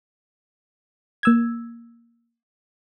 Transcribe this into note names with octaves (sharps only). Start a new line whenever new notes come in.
A#3 E6 G#6